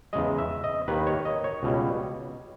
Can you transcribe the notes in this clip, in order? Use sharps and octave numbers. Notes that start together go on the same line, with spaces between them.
E2 C#3 G#3 D#5
E5
D#5
D#2 D#3 A#3 B4
C#5
D#5
C#5
C#2 B2 G3